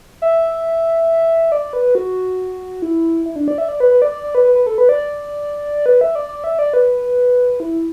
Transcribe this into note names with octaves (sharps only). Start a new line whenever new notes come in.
E5
D5
B4
F#4
E4
E4
D4
D5
E5
D5
B4
B4
D5
D5
D5
B4
B4
B4
A4
B4
D5
B4
E5
D5
D5
E5
D5
B4
E4